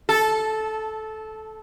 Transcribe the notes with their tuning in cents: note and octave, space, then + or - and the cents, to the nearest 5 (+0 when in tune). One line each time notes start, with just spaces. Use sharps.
A4 -15